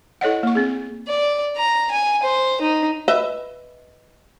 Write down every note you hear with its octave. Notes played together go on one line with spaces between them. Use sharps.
E4 A4 C#5 D#5 F#5
A#3 C#6
C4 G#4
D5
A#5
G#5
C5
D#4
B4 D#5 E5